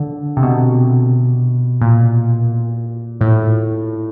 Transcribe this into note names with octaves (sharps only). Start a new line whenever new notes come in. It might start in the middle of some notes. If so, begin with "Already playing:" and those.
Already playing: D3
C3
B2
A#2
A2